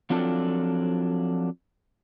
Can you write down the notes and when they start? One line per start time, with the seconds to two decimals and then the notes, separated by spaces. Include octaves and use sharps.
0.10 F3 F#3 C4 D4 F4 A4